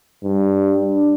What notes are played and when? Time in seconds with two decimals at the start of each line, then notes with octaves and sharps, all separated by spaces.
0.24 G2
0.81 D4